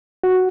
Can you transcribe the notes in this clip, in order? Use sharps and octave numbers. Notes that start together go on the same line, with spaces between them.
F#4